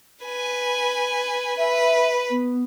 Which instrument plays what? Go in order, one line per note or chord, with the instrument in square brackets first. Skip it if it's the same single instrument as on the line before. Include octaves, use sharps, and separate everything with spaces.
[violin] B4 G#5
[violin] B4 [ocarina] E5
[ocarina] B3